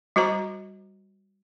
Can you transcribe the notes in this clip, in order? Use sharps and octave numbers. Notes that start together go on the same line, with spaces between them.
G3 F#4 C5 A#5